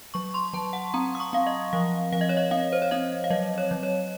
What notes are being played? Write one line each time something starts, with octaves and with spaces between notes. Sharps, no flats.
F#3 C#6
C6
F#3 A5
F#5
C4 A#5
D#6
C#6
C4 F5
D#5
F3 F5
F3 F5
D#5
C#5
D#5
C4 F5
C5
C#5
C4 D#5
F5
F#3 D#5
C#5
F#3
C#5